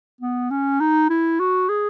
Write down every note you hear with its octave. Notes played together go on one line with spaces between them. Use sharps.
B3
C#4
D#4
E4
F#4
G#4